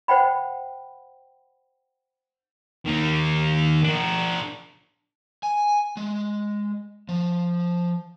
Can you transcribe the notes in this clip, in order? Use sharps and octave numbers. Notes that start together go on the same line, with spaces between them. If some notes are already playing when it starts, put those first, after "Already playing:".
C5 F#5 G5 B5
D#3 A#3
D4 A#4
G#5
G#3
F3